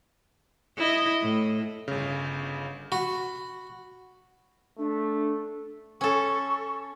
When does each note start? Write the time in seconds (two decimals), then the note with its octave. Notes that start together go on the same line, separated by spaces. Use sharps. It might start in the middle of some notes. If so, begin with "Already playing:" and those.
0.77 E4 D#5
1.22 A2
1.88 G1 C#3
2.92 F#4 B5
4.78 A3 D4
6.01 C#4 A4 C#6